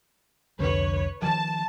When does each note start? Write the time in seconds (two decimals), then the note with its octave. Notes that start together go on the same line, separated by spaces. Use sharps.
0.59 C2 F2 D3 B4 C#5
1.22 D#3 F3 A5